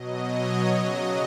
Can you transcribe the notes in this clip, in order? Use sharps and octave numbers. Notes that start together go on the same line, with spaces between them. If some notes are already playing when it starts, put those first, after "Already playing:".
Already playing: B2 F#3 D#5
C#5
C#3 F#3 D#5